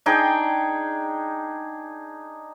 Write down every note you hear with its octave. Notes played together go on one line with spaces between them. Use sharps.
D4 D#4 G#4 G5